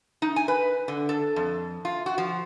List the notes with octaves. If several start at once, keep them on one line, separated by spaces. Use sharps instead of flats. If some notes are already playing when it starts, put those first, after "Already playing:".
D#4
G#5
B4
D3
A4
F2
F4
F#4
F3